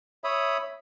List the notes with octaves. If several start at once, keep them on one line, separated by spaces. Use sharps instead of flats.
C#5 E5 B5 D#6